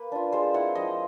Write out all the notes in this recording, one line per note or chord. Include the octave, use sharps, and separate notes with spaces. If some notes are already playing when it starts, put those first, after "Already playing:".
Already playing: A#3 B4
D4 F4
G#3 C5
C4 E4 F#5
F3 D#5